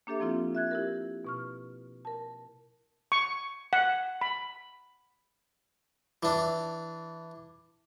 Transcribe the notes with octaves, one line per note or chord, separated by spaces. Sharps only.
A#3 D4 G4 A4 E5
F3 C4 E4 F4
E5 F#6 G#6
E4 G4 A#4
B2 C#6 F6
A#4 A5
C#6
F#5
B5
E3 D4